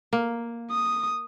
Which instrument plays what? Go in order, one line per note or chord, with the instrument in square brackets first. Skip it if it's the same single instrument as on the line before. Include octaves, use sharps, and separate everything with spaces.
[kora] A#3
[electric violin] D#6